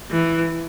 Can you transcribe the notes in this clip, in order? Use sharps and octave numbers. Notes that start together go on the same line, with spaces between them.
E3